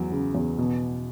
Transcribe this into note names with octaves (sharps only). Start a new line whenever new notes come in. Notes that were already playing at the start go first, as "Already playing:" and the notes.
Already playing: E2 F#3
C#3
E2
B2